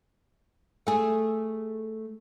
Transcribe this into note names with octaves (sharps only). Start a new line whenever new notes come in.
A3 G#4